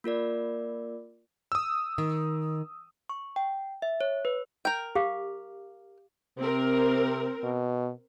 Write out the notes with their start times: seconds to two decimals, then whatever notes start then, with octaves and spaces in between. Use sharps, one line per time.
0.04 A#3 F4 A#4 D5
1.52 D#6 E6
1.98 D#3
3.09 C#6
3.36 G5
3.82 E5
4.01 C#5
4.25 B4
4.65 A#4 G5
4.95 G4 F5 D6
6.38 C3 C4 A#4
7.43 B2